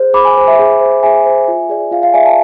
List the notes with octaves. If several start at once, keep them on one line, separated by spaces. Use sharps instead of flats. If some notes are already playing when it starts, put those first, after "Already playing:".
Already playing: G#4 C5
G#4 B5 D6
G#5 B5
C5
E5 G#5
G#4
C5
G#4 E5 G#5
C5
F4
G#4 D5
F4 F5
F5
G#4 D5 E5 G#5
F5 A5